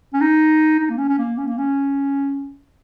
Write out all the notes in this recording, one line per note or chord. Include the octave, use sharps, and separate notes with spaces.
C#4
D#4
D#4
A#3
C#4
C#4
A#3
C#4
A#3
C#4